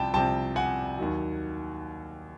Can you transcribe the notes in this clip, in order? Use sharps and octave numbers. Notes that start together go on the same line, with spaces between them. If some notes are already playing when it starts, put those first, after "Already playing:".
Already playing: C2 C3 F3 G5 A5
C2 C3 F3 G5 A5
F#5 G#5
D#2 D#3 F#3